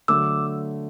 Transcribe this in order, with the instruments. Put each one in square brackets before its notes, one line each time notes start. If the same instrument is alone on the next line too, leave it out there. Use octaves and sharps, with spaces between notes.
[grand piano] D3 F#3 A3 [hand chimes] D6 E6